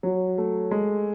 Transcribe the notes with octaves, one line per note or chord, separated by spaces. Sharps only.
F#3
A3
G#3